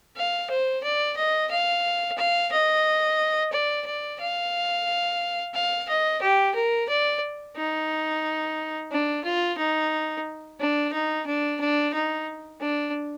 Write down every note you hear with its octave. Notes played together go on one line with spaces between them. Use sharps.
F5
C5
D5
D#5
F5
F5
D#5
D5
D5
F5
F5
D#5
G4
A#4
D5
D#4
D4
F4
D#4
D4
D#4
D4
D4
D#4
D4